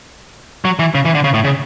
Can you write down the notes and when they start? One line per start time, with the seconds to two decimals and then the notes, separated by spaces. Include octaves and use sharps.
0.65 F#3
0.79 E3
0.95 C#3
1.05 E3
1.15 D3
1.24 C#3
1.34 A2
1.45 C#3